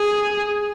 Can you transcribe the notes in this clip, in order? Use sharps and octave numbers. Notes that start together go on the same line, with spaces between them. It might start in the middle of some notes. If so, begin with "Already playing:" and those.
Already playing: G#4